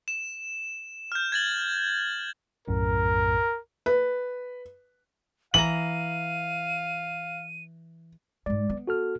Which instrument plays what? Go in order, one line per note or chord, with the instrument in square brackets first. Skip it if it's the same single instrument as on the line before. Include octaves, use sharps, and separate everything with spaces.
[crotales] E7
F6 G6
G#6 A6 F#7
[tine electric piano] B1 F#2 A2 [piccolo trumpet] A#4
[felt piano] B4
[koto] E3 A#5 [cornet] F5 [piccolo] D#7 [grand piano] F#7
[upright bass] G#2 G#3 [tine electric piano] D5
[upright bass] B3
[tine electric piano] F#4 A4 F6